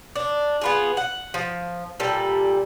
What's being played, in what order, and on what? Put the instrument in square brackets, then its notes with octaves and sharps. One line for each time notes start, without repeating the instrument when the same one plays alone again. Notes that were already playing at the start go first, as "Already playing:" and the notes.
[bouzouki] D4
B3 F4 G#4
F#5
F3
A#2 G3 A4